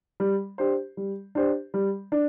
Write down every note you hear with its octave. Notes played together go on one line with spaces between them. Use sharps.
G3
D4 G4 C5
G3
D4 G4 C5
G3
D4